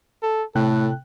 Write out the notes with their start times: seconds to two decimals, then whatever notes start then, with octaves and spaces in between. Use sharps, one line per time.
0.23 A4
0.55 A2 C3 A4 G5 F#6